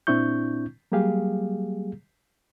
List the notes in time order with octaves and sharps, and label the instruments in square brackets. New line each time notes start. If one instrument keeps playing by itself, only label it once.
[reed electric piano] A#2 C4 D4 E4 C#6 G6
F#3 G3 A#3 G4 G#4 F5